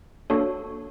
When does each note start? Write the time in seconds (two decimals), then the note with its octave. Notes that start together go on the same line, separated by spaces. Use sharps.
0.30 A#3 D4 F#4 A4 C#5